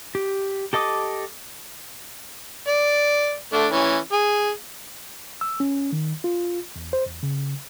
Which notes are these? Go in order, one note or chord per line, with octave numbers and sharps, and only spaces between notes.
G4
G4 A4 D#5 D6 D#6
D5
A3 D4
E3 C#4
G#4
E6
C#4
D#3
F4
E2
C5
E2
C#3